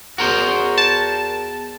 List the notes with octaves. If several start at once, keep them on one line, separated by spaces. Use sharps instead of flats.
E2 F#4 A#4 C5
A5